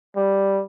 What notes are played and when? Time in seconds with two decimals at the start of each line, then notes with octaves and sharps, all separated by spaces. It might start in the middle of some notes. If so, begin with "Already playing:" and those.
0.16 G3